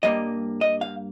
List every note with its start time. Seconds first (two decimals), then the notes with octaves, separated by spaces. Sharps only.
0.03 G2 G3 A#3 D#5
0.61 D#5
0.81 F5